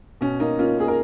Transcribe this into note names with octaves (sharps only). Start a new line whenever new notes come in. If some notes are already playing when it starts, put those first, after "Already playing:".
B2 C#4
A#3 D#4
A#3 C#4 F4
A#3 G#4
A#4